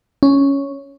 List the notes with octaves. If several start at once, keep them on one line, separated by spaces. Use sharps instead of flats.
C#4